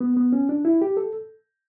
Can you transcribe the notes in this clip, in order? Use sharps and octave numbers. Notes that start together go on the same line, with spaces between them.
B3
B3
C#4
D4
E4
G4
A4